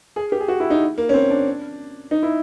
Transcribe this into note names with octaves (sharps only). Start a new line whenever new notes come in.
G#4
G4
G#4
F#4
E4
D#4
A#3
C#4
C4
D4
D#4
E4